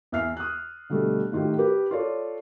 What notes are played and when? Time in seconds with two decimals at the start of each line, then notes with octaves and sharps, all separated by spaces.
0.12 E2 E5 F6 C7
0.37 D#6 F#6
0.89 B2 D3 G3 A3
1.32 A2 D#3 F4 G4
1.59 G4 B4
1.91 F4 A4 C#5 D5